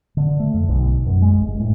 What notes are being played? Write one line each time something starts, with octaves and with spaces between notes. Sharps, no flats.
D3
A3
F2
B1
F#2
G#3
G1
A2